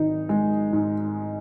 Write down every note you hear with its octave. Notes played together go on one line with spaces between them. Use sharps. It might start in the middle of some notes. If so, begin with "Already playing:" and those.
Already playing: G#1 D#4
G#3
G#2